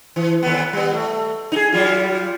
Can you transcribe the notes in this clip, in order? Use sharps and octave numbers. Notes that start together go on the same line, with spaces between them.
E3
D#2 B3
G3 B3
A3
D#4 G#4
F#3 G3 F4